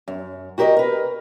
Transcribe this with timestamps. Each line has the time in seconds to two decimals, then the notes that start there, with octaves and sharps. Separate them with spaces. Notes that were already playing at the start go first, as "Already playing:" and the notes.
0.08 F#2
0.58 F#4 G4 A#4 C#5 D#5
0.77 A#4 B4